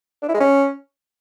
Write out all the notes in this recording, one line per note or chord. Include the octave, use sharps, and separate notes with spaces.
D4
E4
G#3
C#4